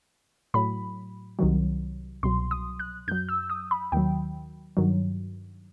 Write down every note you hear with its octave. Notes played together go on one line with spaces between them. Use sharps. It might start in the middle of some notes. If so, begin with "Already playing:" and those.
A2 F#3 B5
C2 C3 D#3 F#3
C2 B2 F#3 C6
D#6
F#6
F#2 F#3 G6
E6
D#6
B5
D#2 D#3 F#3 G5
G2 D#3 F#3